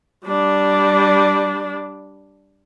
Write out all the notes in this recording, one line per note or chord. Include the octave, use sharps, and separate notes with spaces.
G3 D4